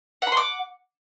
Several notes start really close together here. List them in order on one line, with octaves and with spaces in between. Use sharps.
F#5 B5 C6 D6